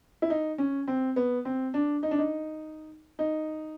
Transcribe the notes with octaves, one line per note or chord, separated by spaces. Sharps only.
E4
D#4
C#4
C4
B3
C4
D4
D#4
D4
D#4
D#4